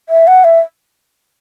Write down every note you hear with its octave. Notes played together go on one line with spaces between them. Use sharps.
E5
F#5
E5